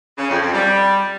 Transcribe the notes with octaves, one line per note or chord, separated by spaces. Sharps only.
C#3
F2
F2
G3